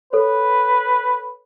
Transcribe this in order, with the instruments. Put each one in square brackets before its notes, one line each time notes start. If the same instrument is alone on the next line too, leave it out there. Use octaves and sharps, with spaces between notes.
[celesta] A4 C#5 [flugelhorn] B4